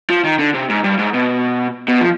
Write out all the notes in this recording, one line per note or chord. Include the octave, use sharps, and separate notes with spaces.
F3
D#3
D3
C3
G#2
G2
G#2
B2
B2
F3